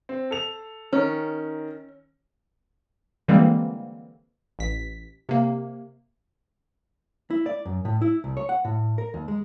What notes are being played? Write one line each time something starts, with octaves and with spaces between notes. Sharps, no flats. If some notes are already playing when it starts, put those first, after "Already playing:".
C4
A4 F7
D#3 C#4 A#4
D3 E3 G3 G#3 A#3 C4
A1 B6
C3 A#3
E4
D5
F#2
A2
E4
C2
C#5
F#5
A2
A#4
D#2
G#3